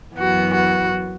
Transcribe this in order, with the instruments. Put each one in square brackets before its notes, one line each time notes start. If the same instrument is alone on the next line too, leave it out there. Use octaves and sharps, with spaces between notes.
[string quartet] F#2 E3 B3 F#4
F#4